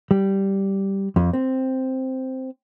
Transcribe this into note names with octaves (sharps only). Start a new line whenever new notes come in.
G3
F2
C4